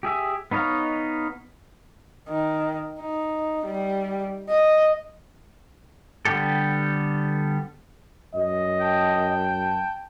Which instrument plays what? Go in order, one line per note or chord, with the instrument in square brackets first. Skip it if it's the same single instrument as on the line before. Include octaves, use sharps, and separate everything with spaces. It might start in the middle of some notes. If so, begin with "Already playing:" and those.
[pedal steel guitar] G4 G#4 E5
B3 D#4 C#5 D#5 F5
[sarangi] D#3
D#4
G3
D#5
[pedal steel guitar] D3 G3 B3 G4 A4
[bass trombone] F#2 [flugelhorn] D#5
[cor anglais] G5 [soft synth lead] A5